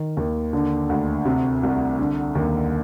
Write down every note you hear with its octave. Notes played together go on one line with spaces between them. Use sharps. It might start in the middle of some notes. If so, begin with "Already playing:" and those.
Already playing: D#3
D#2
D3
D2
C3
C2
D3
D#2